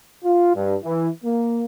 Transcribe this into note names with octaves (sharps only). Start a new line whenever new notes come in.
F4
G2
E3
A#3